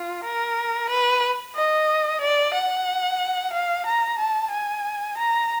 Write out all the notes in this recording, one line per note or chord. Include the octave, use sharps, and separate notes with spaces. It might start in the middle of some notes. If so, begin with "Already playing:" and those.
Already playing: F4
A#4
B4
D#5
D5
F#5
F5
A#5
A5
G#5
A#5